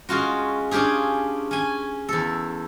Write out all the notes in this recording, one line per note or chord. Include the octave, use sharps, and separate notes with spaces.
G#3 C#4 F4 F#4
C#4 D4 F4 G4 G#4
C#4 G#5
E2 A4